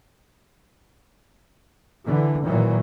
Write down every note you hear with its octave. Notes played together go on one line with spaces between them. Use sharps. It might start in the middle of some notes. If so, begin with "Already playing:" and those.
D3 E3
A#2 D#3 E3 F#3